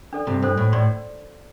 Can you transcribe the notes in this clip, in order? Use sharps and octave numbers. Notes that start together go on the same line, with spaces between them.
D4 A4 D5
G2 C3
G2 D4 A4 C5
A2
A2 D5 C6